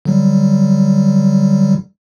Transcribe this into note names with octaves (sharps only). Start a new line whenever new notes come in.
D3 F#3 G3